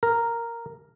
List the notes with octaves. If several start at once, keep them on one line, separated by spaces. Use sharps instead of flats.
A#4